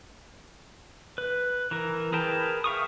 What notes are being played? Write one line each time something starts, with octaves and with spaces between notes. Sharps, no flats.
B4
E3 A#4
G#4 A#4 B4 G5 A5
E5 F5 C#6 D#6